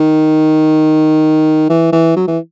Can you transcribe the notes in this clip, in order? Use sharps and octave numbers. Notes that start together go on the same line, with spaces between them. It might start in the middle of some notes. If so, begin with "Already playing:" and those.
Already playing: D#3
E3
E3
F#3
E3